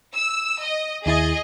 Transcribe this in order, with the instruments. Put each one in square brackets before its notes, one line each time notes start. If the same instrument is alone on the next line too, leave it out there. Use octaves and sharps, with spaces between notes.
[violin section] E6
D#5
[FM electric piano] D#2 E4 A6 [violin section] G#4 D#5